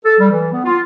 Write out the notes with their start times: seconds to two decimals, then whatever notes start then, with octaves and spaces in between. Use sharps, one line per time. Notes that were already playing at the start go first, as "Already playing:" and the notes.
0.04 A4
0.19 G3
0.31 E3
0.52 B3
0.65 F4